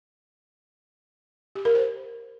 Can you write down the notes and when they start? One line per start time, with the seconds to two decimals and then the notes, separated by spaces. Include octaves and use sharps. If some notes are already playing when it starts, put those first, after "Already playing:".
1.55 G4
1.65 A#4
1.75 C5